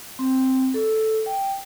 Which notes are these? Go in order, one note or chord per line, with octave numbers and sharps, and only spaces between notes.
C4
A4
G5